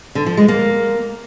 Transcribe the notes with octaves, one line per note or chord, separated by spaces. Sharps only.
D3
F3
G#3
A#3